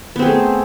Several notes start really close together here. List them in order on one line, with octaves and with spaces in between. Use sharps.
B3 C4 G#4 A3